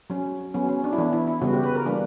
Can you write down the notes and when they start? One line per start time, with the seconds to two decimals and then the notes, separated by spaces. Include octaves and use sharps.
0.10 F#3 C#4
0.54 F#3 B3 C#4
0.69 C#4
0.84 D4
0.93 E4
0.98 E3 B3 D4
1.13 E4
1.27 E4
1.42 C#3 G3 B3 F#4
1.53 G4
1.64 B4
1.75 A#4
1.86 E3 G3 A#3 D4